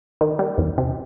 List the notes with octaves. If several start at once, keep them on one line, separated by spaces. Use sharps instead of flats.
D#3
G3
E2
C3